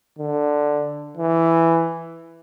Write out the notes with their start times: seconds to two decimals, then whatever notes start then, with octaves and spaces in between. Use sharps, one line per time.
0.19 D3
1.17 E3